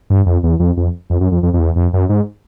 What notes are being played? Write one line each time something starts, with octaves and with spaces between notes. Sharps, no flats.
G2
F2
E2
F2
F2
F2
F#2
F2
F2
F2
E2
F2
F#2
G#2